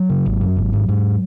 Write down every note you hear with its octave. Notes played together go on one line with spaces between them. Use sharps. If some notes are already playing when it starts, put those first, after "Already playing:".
Already playing: F#3
C#3
G#1
F#2
G#1
G#2
G#2